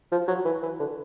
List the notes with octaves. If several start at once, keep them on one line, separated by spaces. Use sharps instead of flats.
F3
F#3
E3
E3
D3